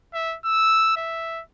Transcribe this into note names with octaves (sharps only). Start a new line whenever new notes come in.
E5
E6
E5